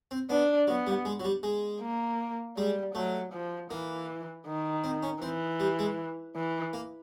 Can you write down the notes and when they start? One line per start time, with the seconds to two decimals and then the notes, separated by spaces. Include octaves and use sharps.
0.11 C4
0.30 B3 D4
0.67 F#3 B3
0.87 G3
1.05 G#3
1.20 F#3
1.25 G3
1.43 G#3
1.81 A#3
2.57 G3 G#3
2.95 F#3 A3
3.33 F3
3.71 E3 A#3
4.47 D#3
4.84 C4
5.03 C#4
5.22 E3 C4
5.60 G3
5.79 G#3
6.36 E3
6.73 A#3